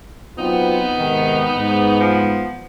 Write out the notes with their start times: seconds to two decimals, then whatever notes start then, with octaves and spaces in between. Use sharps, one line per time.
0.38 F#3 B3 C4 D#4 F4
0.98 G#2 C3 D#3
1.57 G#2
2.00 F3